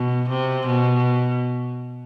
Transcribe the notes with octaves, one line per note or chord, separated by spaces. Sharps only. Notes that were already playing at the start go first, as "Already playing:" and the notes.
Already playing: B2
C3
B2